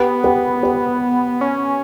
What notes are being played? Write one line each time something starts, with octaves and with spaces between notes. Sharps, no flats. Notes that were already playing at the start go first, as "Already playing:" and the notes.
Already playing: B3 G4 B4
G4 B4
G4 B4
C#4